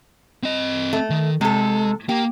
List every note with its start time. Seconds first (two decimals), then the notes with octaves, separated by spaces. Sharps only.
0.43 C4 D#5
0.93 A3
1.10 D#3
1.41 C3 G#3 A4
2.09 A#3 G4